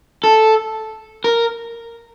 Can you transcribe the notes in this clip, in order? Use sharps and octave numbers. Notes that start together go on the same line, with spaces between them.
A4
A#4